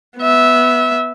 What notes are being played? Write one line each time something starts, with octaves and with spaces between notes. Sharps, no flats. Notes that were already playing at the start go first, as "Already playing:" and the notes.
B3 E5